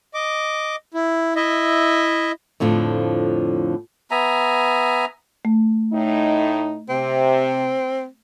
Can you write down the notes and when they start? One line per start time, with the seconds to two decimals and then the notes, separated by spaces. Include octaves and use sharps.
0.14 D#5 D6
0.94 E4
1.36 E4 D#5 E5
2.60 F2 A2 D3 F3
4.11 B3 E5 G#5 A#5
5.45 A3
5.92 A2 D#4
6.89 C3 C4